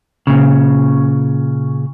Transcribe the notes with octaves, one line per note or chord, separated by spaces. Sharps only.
A#2 C#3